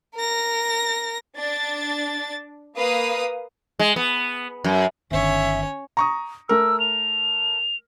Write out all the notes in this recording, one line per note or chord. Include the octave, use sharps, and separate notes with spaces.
A#4 A#6
D4 A6
A#3 B4 F5 D#6
G#3
B3
F#2
G1 D#3 C#4 C#5 E5
A#5 C#6 D#6
A3 A#4 E6
F7